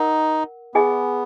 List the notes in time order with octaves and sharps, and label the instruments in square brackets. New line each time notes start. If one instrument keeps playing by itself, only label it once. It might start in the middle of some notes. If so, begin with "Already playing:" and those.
Already playing: [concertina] D#4 [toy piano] A#4 F#5
[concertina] B3 [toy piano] G#4 D#5 G#5